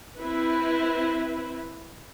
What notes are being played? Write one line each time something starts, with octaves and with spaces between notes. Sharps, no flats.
C4 E4 B4